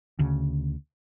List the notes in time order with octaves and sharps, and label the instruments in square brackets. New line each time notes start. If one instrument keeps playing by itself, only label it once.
[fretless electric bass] D2 C#3